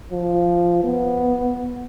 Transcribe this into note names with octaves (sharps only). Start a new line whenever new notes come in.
F3
B3